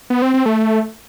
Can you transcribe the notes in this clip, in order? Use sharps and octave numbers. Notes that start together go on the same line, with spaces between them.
B3
C4
C4
A3